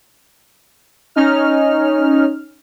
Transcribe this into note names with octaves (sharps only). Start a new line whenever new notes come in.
C#4 D#4 F6